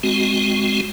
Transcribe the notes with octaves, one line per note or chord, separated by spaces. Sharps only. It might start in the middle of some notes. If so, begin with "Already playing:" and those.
G#3 C4 F#4